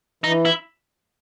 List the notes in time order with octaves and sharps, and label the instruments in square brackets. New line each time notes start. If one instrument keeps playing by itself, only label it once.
[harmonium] E3 [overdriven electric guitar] D#4
[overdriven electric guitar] E4